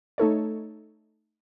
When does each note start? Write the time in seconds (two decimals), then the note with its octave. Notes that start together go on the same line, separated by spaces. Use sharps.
0.18 A3 D#4 A4 C#5